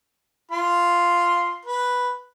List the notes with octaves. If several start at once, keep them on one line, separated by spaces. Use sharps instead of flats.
F4 C6
B4